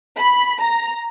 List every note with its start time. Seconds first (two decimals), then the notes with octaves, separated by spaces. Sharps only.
0.19 B5
0.61 A#5